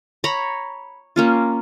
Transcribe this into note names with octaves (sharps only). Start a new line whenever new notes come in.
C#5 A#5 B5
A#3 C#4 F4